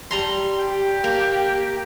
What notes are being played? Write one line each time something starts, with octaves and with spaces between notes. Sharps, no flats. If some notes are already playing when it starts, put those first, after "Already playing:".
G3 A#5 C6
G4
A#3